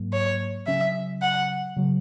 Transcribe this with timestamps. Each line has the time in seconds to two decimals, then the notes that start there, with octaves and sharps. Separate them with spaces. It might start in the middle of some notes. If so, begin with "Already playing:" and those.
Already playing: G#2 F#3 A#3
0.13 C#5
0.67 C#3 F#3 C#4 E5
1.22 F#5
1.76 C#3 F#3